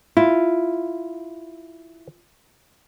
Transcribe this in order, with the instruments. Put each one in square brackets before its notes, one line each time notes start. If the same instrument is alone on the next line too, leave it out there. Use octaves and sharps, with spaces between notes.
[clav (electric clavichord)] E4 [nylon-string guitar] F4